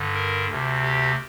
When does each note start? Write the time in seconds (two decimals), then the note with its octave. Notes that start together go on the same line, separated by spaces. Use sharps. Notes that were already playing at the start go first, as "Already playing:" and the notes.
Already playing: G2 D3
0.14 A#4
0.48 D2 C3
0.82 G4